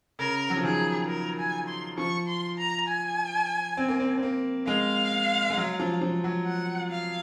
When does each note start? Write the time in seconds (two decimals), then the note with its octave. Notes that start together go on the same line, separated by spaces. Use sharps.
0.19 C#3 A#4
0.50 F#3
0.57 F3
0.63 D#3 G#4
1.08 A#4
1.39 G#5
1.68 C6
1.98 F3 C#6
2.28 C6
2.58 A#5
2.88 G#5
3.77 C4
3.88 A#3
4.00 C4
4.18 C4
4.23 A#3
4.67 G#3 F5
5.50 G#3
5.57 F#3
5.80 F3
6.01 F3
6.24 F#3
6.47 F#5
6.91 F5